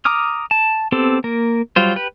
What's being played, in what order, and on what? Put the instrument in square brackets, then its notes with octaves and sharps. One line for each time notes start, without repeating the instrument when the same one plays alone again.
[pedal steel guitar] A#5 D6 D#6 F6
A5
B3 C4 G4 A4
A#3 A#4
F#3 G3 F4 C5
G4 B4